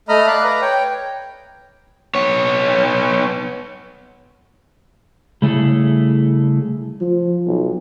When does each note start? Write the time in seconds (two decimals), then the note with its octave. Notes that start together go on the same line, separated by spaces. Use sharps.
0.09 A3 D#5 A#5 B5 F6
0.27 D5 F5 B5 F#6
0.44 B4 A#5
0.62 C#5 G5
2.15 B3 C#5
5.42 C#3 G3 A3 E4 G#4 A4
7.01 F3
7.47 B1